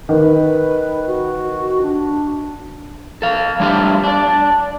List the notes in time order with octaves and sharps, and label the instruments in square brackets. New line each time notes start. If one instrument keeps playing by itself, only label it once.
[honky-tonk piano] D#3 [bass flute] B4
[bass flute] F#4
D4
[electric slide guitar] A4 F5
G3 A3 D4 F4 G4 F5
D4 D5